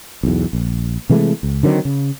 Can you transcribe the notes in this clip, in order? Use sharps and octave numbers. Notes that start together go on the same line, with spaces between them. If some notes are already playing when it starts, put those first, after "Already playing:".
B1 E2
A#1
C3 E3 G#3 A3
C#2
D3 D#3 F#3 C4
C#3